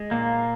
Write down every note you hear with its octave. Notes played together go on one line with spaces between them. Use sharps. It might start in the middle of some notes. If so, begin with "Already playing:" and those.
Already playing: G#3
A#2 A#3